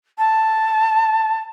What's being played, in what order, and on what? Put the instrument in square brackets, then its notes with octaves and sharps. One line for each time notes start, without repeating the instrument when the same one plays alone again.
[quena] A5